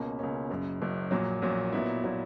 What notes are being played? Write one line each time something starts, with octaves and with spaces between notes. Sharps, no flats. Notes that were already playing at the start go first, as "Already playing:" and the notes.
Already playing: C#2 B2 A#3 C#4
C#2 B2 A#3 C#4
F#1 F#2 C#3
F#1 F#2 C#3
A#1 A#2 F#3
A#1 A#2 F#3
B1 A#2 F#3 B3 E4
A#2 F#3 B3 E4